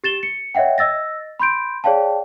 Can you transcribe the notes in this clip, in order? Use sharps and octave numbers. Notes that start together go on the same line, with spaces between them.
G4 A6 E7 G7
C#7
C#5 D#5 E5 F#5 G5
D#5 E6 A6 A#6
B5 C6 G6 D7
G#4 C#5 D5 F5 G5 A5